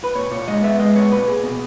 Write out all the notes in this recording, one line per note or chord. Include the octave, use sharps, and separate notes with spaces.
B4
A#2 C#5
A#2 C#5
G#3 D#5
B3 E5
G#3 D#5
B3 C#5
A#2 B4
A#2 G#4
B2